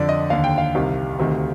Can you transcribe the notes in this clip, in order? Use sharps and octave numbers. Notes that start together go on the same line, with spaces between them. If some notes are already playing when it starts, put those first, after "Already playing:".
Already playing: F2 D3 D5
D#5
D#2 D3 F5
G5
F5
C2 C3 D#3
D2 C3 D#3